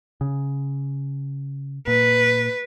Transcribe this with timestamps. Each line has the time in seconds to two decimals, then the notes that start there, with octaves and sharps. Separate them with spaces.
0.21 C#3
1.87 A#2 B4